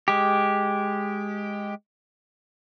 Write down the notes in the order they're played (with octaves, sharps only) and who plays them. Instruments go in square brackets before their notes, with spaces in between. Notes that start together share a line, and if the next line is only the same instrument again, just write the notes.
[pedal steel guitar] G#3 G4